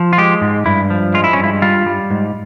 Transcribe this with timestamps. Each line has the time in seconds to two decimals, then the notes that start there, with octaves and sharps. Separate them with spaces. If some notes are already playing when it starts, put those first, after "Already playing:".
Already playing: F3
0.13 F4
0.18 G#3 G4
0.41 G#2
0.66 G2 E4
0.90 F3
1.14 G#3 F4
1.24 E4
1.33 C#4
1.38 G2
1.44 E4
1.62 G3 F4
1.86 G3
2.11 G#2